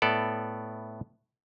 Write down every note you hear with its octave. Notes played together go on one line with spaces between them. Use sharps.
A2 B3 A4 D5